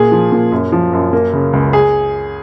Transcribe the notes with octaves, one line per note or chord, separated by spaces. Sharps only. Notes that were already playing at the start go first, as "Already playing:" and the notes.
Already playing: A#2 G#4
F3
A#2
F#2
F3
F#2
A#3
C#3
C#2
G#4